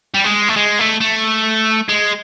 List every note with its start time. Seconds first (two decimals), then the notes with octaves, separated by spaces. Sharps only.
0.15 G3
0.25 G#3
0.49 A3
0.57 G#3
0.79 A3
1.01 A3
1.88 G#3